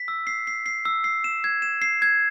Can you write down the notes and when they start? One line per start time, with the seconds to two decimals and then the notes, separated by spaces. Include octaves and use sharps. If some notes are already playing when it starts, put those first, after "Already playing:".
Already playing: B6
0.08 E6
0.27 C7
0.47 C7
0.66 C7
0.85 E6
1.04 C7
1.24 E7
1.44 G#6
1.62 E7
1.82 C7
2.02 G#6